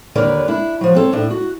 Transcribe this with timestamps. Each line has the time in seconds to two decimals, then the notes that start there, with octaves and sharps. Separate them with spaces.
0.15 D#2 D3 A#4 B4 C#5 D5
0.48 D4 E4
0.81 F3 F#3
0.95 C4 A4 C#5
1.13 A2 D4
1.31 F#4